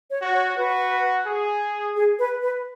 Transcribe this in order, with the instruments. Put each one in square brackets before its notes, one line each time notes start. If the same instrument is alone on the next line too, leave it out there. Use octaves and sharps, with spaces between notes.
[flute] C#5
[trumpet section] F#4
[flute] C#5
[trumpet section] F#4 [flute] B4
[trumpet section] G#4
[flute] G#4
B4
B4